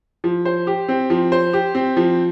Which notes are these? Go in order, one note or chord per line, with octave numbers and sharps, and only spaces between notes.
F3
C5
G4
C4
F3
C5
G4
C4
F3